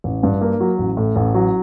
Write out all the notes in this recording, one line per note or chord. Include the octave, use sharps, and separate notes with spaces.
A1
G2
A#3
F#3
A1
A2
A1
F#3